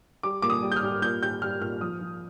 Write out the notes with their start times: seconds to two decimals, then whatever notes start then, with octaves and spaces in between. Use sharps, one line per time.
0.23 G3 D6
0.42 A#2 D6
0.50 D#6
0.63 G3
0.72 G6
0.76 F6
0.83 G3
1.02 A#2 G6
1.22 G3 G6
1.42 G3 F6
1.61 A#2 F6
1.81 F3 D#6
2.01 F3